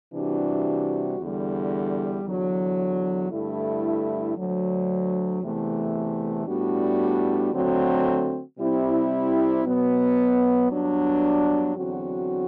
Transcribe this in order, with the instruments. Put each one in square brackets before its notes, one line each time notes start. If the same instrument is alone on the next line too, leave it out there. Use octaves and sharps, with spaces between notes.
[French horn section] C3 E3 G3 D4 F#4
E2 D3 G3
E2 D3 F#3
G2 D3 A3 E4
D2 D3 F#3
E2 C3 E3 A3
A2 G3 B3 D4 F#4
D3 F#3 A3 C4 F#4
C3 G3 C4 E4
B2 F#3 B3
G2 F#3 B3 D4
E2 D3 F#3 C4 F#4